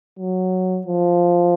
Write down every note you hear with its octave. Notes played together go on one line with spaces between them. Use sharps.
F#3
F3